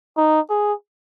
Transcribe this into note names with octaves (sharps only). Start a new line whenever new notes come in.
D#4
G#4